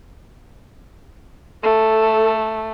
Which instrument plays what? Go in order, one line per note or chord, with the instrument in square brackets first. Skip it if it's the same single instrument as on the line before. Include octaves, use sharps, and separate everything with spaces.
[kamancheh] A3 [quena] A4